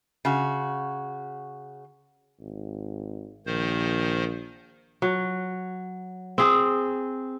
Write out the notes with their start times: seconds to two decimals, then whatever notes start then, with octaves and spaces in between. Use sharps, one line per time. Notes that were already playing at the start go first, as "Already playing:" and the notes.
0.25 C#3 F#4
2.40 G#1
3.46 A#1 D#3 C5
5.02 F#3
6.38 C4 G#4